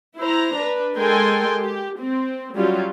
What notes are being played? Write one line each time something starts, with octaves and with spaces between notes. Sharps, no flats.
E4 C5 A#5
D4 B4
G#3 A4 A#4 G5 G#5 C6
G4
C4
F#3 G3 C#4 F4